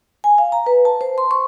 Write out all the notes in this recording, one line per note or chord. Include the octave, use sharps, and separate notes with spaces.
G#5
F5
A#5
B4
A5
C5
C6
C#6